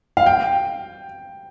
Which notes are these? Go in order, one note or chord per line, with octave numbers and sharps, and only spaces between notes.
F5
G5